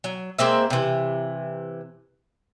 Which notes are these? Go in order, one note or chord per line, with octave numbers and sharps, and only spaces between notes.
F#3
G#3 A#3 C4 E5
C3 E3